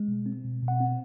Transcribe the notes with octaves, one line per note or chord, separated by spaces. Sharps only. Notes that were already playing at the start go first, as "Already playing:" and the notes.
Already playing: G#3
B2
C4
B2
B2
F#5
C4